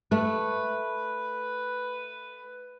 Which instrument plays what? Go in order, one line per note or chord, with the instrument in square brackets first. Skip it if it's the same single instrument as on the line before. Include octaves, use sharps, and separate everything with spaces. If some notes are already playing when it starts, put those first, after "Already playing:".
[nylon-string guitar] A3 [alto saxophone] B4